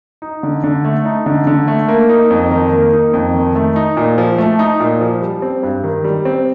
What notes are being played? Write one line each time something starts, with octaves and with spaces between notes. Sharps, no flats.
D#4
D3
D3
A3
D#4
D3
D3
A3
A#3
D#4
F2
D#3
A#3
D#4
F2
D#3
A3
D#4
A#2
F3
A3
D#4
A#2
F3
G3
C4
G2
D#3
G3
C4